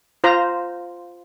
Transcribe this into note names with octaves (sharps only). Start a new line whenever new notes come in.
F4 C5 A#5